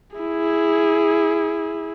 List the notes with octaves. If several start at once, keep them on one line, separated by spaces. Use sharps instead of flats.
E4 G#4